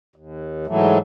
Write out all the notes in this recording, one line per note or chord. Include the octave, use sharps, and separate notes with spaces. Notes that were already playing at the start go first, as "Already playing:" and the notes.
D#2
G#2 E3 F#3 A3